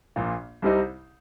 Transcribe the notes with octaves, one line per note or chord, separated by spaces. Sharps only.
A#1 A#2 A#3 F4
C2 C3 G3 C4 D#4